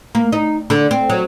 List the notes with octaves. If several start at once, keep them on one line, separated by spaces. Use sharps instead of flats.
A#3
D#4
D3
C4
F#3